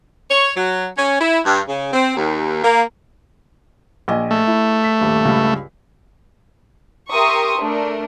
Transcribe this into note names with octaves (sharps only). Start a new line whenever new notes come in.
C#5
F#3
C#4
E4
G2
C#3
C4
D#2
A#3
A#1 D#5 G#5
A3
E4
B6
D#1 G2
C#2 G2
G4 A#4 E5 C6 C#6 D#6
A3 D4 A#4